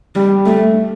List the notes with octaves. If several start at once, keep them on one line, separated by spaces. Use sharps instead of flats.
G3
A3